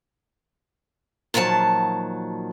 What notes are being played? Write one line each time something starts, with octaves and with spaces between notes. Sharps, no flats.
A#2 D#3 F3 F#3 A5